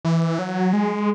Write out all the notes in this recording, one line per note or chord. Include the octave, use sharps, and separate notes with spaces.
E3
F#3
G#3